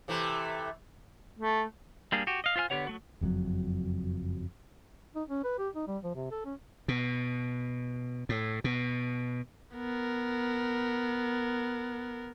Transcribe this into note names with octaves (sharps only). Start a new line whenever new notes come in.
C3 E3 A3
A3
G3 A#3 D4 G#4
F#4 G4
D#5 F5
F4 C5 F5 G#5 F6
D3 B3 G4 C#5 F#5
F#3 A3 F#4
F#1 F2 B2 F#3
D#4
C#4
B4
G4
D#4
G3
F3
C3
A4
C#4
B2
A2
B2
B3 A#4